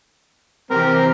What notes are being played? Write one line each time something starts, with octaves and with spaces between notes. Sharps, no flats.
C3 E3 C4 G4 A#4